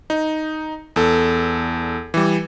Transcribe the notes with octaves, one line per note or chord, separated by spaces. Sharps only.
D#4
E2 A4
E3 G3